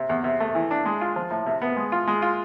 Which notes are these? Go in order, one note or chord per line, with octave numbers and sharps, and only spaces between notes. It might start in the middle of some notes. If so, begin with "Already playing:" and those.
Already playing: C3
E2
C3
A3
E3
D4
G#3
F4
F3
A2
C3
B3
G#3
F4
G#3
F4